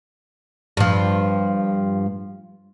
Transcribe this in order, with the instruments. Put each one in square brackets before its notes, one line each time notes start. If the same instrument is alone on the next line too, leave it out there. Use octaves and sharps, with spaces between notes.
[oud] G2 F3